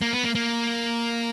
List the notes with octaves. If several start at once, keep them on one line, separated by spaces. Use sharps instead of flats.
A#3
B3
A#3
A#3